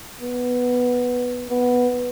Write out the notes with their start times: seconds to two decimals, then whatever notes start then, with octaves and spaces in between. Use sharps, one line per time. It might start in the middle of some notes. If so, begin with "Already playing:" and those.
0.21 B3
1.49 B3